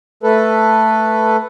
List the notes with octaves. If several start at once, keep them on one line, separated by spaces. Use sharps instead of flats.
A3 A4 B4